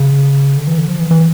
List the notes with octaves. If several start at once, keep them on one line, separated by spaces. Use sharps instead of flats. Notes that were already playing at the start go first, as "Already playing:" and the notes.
Already playing: C#3
D3
E3
D3
F3
E3
E3